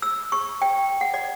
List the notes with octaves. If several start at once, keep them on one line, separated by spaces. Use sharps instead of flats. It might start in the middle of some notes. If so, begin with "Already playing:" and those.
E6
C#6
G5
F#5
D5